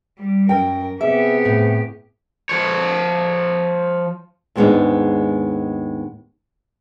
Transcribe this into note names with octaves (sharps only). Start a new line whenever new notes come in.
G3
F#2 A#4 G5
C3 B3 G4 G#4 E5
A2
F3 C#5
D#2 G#2 G#3 B3 D4 D#4